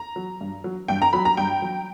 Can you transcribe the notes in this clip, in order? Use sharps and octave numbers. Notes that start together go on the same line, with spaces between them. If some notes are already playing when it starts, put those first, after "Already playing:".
Already playing: A#5
F#3
G2
F#3
G2 G5
A#5
F#3 B5
A#5
G2 G5
F#3